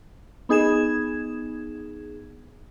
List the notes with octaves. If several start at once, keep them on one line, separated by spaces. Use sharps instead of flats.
B3 D#4 G#4 G#6 E7